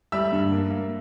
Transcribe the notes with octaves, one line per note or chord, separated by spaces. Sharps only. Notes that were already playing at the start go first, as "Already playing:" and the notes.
G3 E5 E6
G2
A#3
A#3